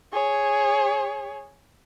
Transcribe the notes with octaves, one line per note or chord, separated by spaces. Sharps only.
G#4 C#5